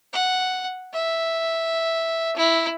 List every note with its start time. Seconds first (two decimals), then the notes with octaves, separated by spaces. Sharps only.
0.13 F#5
0.93 E5
2.36 E4